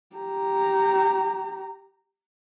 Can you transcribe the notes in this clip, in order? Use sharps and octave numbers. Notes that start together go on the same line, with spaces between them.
G4 A#5